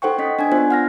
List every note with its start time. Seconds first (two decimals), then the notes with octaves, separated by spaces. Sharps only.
0.02 D#4 A4 C5 F#5 G5 C#6
0.18 C#4 D#5 B6
0.39 D4 G#5 G#6
0.52 B3 D4 F4 C5
0.71 F#5 F6 A#6